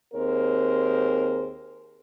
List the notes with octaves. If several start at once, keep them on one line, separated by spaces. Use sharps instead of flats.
D#2 C4 G#4 A#4 C5